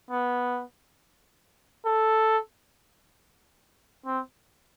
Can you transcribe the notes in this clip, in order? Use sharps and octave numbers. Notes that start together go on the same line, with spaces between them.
B3
A4
C4